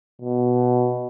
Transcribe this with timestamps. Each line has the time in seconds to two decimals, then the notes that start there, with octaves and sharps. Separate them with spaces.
0.22 B2